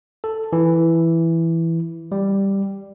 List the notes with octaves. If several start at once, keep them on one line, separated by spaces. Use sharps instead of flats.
A4
E3
G3